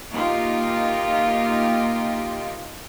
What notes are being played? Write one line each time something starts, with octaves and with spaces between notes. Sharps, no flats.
A#3 D#4 F4 G4